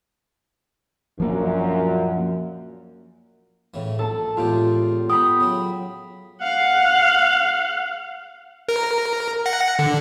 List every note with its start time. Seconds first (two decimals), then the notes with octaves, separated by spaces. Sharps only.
1.20 F#2 A#2 F3 A#3
3.74 A2 C#3 E3
3.99 A#1 A4 A5
4.37 E2 A2 G#3 F4 G4
5.10 B3 G5 B5 D#6
5.40 C#3 F#3
6.42 F5 F#5
8.69 A#4
9.46 F#5 A#6 C#7
9.79 D3